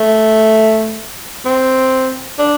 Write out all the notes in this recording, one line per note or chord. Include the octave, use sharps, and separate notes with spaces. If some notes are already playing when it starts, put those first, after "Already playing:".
Already playing: A3
C4
D4